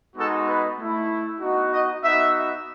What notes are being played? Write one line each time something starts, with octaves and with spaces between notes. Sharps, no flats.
G#3 B3 D#4 F#4 A4
B4
A3 E4
B3 D#4 F#4
D#5
B3 D#4 F#4 E5